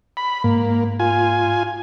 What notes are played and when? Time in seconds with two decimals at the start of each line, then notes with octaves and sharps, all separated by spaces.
0.17 B5
0.44 G#2 A#3
0.99 F4 G#5